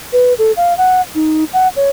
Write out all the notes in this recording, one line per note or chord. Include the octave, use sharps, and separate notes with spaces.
B4
A4
F5
F#5
D#4
F#5
C#5